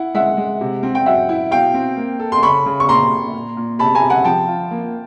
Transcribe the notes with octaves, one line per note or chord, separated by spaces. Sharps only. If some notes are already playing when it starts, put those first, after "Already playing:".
Already playing: E4 F#5
G#3 E5 F#5
G#3
C3
C4
G5
F#3 E5 F#5
E4
B2 F5 G5
C4
A#3
A4
C6
C#3 B5 C#6
C#3
C#6
A#2 A#5 C6
A#2
A#2
A#2
C3 A5 B5
G#5 A#5
C3
F#5 G#5
F3 G5 A5
F4
A#3